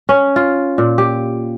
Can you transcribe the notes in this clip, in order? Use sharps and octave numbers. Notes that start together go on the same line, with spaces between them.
C#4
F4
A#2
G4